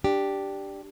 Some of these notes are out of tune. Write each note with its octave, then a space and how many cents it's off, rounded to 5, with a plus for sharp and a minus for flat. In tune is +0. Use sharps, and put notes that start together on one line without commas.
D4 +0 G4 +0